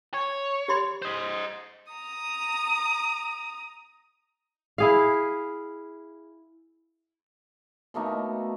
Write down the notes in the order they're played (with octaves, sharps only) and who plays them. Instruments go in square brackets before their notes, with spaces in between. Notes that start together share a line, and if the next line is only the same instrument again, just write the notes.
[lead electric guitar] C#5
[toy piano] G4 B5 C6
[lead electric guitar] C5 D#5
[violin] A#5 D#6
[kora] E4 G#4 F5
[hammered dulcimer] B2 A3 A#3 D#4